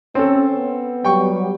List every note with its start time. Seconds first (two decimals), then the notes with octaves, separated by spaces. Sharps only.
0.15 C4 C#4 A4
0.56 B3
1.05 F#3 G3 G4 G5 C#6